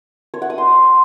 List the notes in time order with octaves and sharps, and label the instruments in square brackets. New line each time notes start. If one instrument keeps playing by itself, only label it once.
[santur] C#5
F#5
D#6
C6